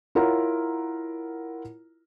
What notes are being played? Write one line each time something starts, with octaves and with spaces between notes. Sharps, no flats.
E4 F4 A#4 C#5 F#5 A#5